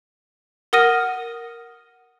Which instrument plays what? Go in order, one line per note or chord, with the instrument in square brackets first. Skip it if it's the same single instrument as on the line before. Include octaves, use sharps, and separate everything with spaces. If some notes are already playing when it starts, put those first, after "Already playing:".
[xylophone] A#4 F#5 D#6 F6 A#6 D#7